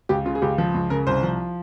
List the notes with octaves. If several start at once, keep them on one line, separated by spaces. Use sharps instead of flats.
C#2 G4
C#3 F4
G#4
C#2 G4
F3
C#2
C#3 A#4
C2 C5
F3